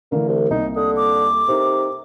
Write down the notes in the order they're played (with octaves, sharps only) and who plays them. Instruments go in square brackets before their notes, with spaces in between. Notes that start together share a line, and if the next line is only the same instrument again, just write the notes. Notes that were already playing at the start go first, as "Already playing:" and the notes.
[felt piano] D3 E3 A3 [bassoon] A#3
[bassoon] C2
[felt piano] C2 A#3 [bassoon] D#4
[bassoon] D3 [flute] D#6
[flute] D6
[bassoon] C3 [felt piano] D#4 A#4